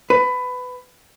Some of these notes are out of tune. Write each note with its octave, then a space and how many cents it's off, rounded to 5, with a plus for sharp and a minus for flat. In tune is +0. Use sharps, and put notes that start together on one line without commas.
B4 +20